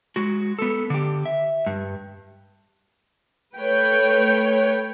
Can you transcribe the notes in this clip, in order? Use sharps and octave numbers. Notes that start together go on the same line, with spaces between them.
G#3 F#4
B3 A4
D3 G4
E5
G2
A3 B4 C#5 G5